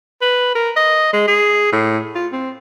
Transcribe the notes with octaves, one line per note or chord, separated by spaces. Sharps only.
B4
A#4
D#5
G#3
G#4
A2
F4
C4